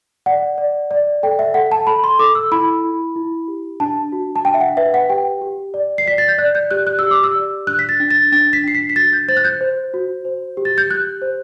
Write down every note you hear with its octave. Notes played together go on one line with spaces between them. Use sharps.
D5 F#5
D5
D5
A4 G5
E5
A4 F#5
A5
A4 B5
C6
A4 D6
E6
E4 B5
E4
E4
G4
D4 A5
F#4
A5
D4 G5
E5
F#5
B4 E5
F#5
G4 G5
G4
D5
C7
D5 B6
A6
G6
D5 F#6
G6
G4 F#6
F#6
G4 E6
D6
E6
D5
D4 F#6
B6
A6
D4
A6
D4 A6
B6
D4 C7
B6
B6
F#4 A6
G6
C5 A6
F#6
G6
C5
F#4
C5
G4
A6
G6
G4 F#6
C5